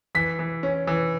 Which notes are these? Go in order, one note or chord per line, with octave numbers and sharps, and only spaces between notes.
E3 B6
E3
C#4
E3